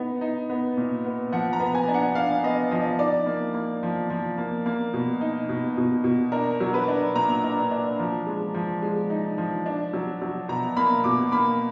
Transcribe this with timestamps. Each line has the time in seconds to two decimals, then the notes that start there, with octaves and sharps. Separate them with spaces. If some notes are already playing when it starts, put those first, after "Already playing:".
Already playing: B3 D#4
0.21 D#4
0.50 B3
0.77 A#2
1.05 B3
1.32 F3 F#5
1.53 A#5
1.60 B3
1.75 G#5
1.88 D4
1.94 F#5
2.15 D4 F5
2.43 B3 D#5
2.71 F3 D#5
2.99 D#4 D5
3.26 A#3
3.54 A#3
3.83 F3
4.10 F3
4.38 A#3
4.66 A#3
4.93 B2
5.21 D#4
5.49 B2
5.77 B2
6.04 B2
6.32 D4 A#4
6.60 F#3
6.74 B4
6.88 D4
7.15 A#2 A#5
7.44 D4
7.71 D4
7.99 F3
8.26 G#3
8.54 F3
8.82 G#3
9.10 D#4
9.38 F3
9.66 D4
9.93 F#3
10.22 F#3
10.48 B2 A#5
10.76 A#3 B5
11.04 B2 D6
11.32 A#3 B5